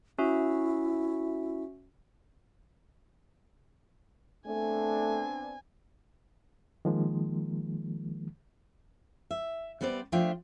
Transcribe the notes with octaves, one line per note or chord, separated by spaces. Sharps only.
C#4 E4 F#4 E5
A3 B3 C4 D4 G#5
D#3 F3 G#3 A#3
E5
G3 B3 C4 C5 D5
F3 A3 D4 F4 E5 G5